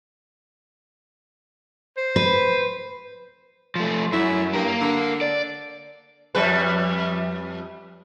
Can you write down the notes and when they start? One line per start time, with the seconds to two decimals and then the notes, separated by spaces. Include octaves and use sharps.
1.97 C5
2.16 B4
3.76 F3 A3
4.13 F#2 E4
4.53 G2 A#3 A#4
4.81 D3
5.21 D5
6.35 F2 G3 B4